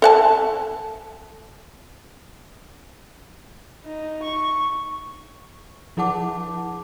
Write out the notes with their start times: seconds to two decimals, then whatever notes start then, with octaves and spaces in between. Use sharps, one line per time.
0.02 A4 F#5 A5
3.85 D#4
4.22 C#6
5.97 F3 E4 G#4 F#5 A5 D6